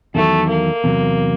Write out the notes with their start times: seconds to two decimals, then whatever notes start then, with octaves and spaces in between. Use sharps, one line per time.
0.15 E2 C3 D#3 F#3 A3
0.49 A#3
0.84 E2 C3 D#3 F#3